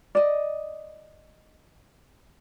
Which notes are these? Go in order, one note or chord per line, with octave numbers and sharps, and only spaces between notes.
D5 D#5